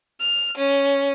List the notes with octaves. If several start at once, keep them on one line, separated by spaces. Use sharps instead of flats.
F6
C#4